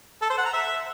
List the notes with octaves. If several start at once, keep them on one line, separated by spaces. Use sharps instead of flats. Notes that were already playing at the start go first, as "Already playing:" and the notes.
A4
C5
F#5
A#5
E5